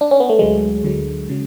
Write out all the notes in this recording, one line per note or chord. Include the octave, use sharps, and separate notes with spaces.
D4
C#4
B3
A3
D2 D3 F#3 G#3
D2 D3 F#3
C#3 F#3